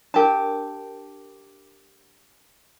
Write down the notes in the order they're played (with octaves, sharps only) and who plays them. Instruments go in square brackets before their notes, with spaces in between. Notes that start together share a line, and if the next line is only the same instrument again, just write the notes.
[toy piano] D4 A#4 [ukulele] G4 A5